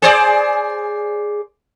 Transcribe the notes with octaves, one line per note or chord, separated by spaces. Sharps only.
G#4 C5 D5